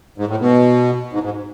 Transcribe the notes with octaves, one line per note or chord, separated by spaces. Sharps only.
G#2
A2
B2
G#2
G#2